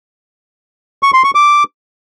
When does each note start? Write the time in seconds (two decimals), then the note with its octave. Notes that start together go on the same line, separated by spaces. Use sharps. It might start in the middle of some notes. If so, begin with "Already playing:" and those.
1.03 C#6
1.13 C6
1.24 C#6
1.35 D6